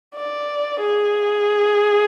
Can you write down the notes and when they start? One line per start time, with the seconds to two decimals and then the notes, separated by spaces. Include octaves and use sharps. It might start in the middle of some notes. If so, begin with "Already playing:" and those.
0.15 D5
0.80 G#4